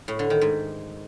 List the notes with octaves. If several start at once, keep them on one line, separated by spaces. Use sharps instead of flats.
A2
D3
D#3
G#2